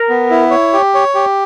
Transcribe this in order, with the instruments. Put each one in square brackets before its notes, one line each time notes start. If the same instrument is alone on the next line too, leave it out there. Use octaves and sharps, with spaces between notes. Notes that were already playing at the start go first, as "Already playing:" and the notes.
Already playing: [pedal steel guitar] A#4
[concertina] B3
E4
C#5
G4
C#5
G4